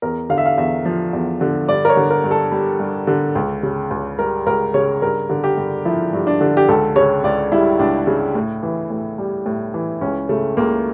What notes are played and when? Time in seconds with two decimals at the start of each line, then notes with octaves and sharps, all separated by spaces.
0.02 E2 A#4
0.30 D3 F5
0.38 E5
0.46 F5
0.58 E2 E5
0.85 F3
1.13 E2
1.41 D3
1.69 G2 D5
1.85 A#4
1.90 C#5
1.97 D3
2.10 A#4
2.24 G2
2.31 A4
2.52 G3
2.80 G2
3.07 D3
3.35 C#2
3.63 C#3
3.91 C#2
4.19 G3 A#4
4.46 C#2 A#4
4.74 C#3 C#5
5.02 G2 A#4
5.30 D3
5.44 G4
5.57 G2
5.85 F3 E4
6.13 G2
6.27 D4
6.41 D3
6.57 G4
6.68 C#2 A4
6.96 C#3 C#5
7.23 C#2 D5
7.52 G3 E4
7.79 C#2 D4
8.07 C#3
8.35 A2
8.63 E3
8.90 A2
9.18 G3
9.46 A2
9.74 E3
10.01 C#2 C#4
10.29 C#3 A3
10.57 C#2 A#3